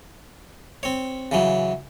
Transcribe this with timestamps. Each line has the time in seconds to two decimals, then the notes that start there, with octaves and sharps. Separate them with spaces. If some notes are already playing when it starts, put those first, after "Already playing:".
0.83 C4 C#5
1.32 C#3 E3 F#3